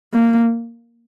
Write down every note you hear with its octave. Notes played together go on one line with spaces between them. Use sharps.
A#3